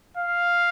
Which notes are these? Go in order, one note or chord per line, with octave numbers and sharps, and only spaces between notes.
F5